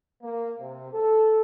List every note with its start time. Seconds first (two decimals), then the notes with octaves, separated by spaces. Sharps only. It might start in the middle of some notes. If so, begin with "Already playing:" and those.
0.22 A#3
0.59 C3
0.92 A4